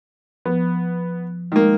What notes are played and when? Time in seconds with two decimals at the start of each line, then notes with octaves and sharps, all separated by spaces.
0.46 F3 B3
1.52 D#3 G#3 A#3